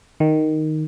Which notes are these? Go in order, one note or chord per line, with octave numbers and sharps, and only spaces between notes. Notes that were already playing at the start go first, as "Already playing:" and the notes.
D#3